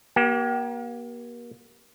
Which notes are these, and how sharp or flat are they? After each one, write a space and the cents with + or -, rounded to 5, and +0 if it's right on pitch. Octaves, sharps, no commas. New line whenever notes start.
A#3 +35 G4 -25